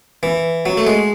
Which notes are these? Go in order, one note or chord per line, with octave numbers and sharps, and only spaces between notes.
E3
F#3
A3
G#3